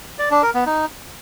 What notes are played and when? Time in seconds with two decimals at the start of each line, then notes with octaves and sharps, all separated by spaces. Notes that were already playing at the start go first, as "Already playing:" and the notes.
0.19 D5
0.31 D4
0.43 A#4
0.54 B3
0.66 D#4